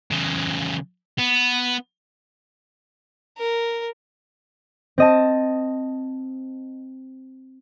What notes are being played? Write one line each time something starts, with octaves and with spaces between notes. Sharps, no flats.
C#3 E3
B3
A#4
C4 D#5 A5